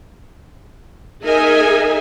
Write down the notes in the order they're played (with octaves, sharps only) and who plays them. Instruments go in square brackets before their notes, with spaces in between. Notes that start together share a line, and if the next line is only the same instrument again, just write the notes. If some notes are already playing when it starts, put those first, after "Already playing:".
[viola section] D#4 G#4 A#4 D#5 E5 G#5